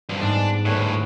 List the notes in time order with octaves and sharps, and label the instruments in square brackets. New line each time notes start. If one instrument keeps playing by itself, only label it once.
[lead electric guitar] G2 F3
[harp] G#2 G3 B3 [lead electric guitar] D4
[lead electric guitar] D2 A2 [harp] B4 C#5 F#5